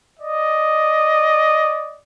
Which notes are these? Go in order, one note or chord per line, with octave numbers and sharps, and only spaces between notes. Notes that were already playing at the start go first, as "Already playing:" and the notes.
D5 D#5